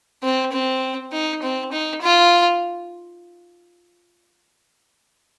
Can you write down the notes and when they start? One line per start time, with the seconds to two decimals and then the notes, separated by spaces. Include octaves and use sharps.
0.23 C4
0.53 C4
1.12 D#4
1.43 C4
1.72 D#4
2.02 F4